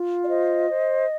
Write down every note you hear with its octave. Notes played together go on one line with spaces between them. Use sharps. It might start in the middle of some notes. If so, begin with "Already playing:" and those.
Already playing: F4
D5
C5 D#5
C5